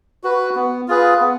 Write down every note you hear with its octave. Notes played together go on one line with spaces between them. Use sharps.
F#4 B4
B3
F4 G#4 B4
B3